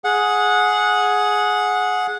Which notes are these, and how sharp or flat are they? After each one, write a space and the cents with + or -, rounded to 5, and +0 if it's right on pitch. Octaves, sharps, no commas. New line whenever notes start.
G#4 +10 F#5 -15